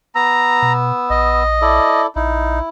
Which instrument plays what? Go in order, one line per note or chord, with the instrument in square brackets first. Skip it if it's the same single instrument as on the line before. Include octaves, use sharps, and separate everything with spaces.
[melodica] B3 E6 [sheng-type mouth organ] A#5
[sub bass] B2
[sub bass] A#1 [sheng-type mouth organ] D#5
[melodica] E4 A4 D5
[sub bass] A#1 [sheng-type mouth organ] D#4 [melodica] E4